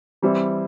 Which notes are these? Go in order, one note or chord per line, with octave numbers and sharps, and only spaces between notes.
E3 G3 C4 E4